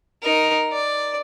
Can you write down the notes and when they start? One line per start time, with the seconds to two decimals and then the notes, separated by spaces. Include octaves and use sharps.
0.23 D#4 A#4
0.72 D5